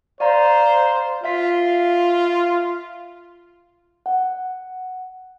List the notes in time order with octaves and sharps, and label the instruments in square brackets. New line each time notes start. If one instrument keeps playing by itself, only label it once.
[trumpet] C5 [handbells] D5 F5 A#5
[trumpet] F4 [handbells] E5 F5 B6
[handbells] F#5